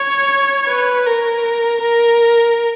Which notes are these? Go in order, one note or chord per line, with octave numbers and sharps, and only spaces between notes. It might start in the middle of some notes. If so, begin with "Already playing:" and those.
Already playing: C#5
B4
A#4
A#4